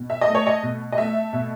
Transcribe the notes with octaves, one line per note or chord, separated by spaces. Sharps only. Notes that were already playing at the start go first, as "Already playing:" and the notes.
Already playing: B2
E5
D#5
A3
C#5
D#5
B2
D#5
A3 E5
B2